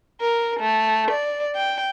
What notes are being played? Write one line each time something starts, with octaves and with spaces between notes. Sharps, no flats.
A#4
A3
D5
G5